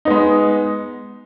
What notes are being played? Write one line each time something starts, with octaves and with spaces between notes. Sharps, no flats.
G#3 B3 D#4